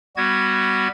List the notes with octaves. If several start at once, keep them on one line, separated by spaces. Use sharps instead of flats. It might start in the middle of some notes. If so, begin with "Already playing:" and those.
G3 B3 F#4 G#6